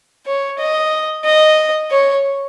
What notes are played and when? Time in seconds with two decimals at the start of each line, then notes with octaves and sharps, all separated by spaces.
0.27 C#5
0.59 D#5
1.25 D#5
1.91 C#5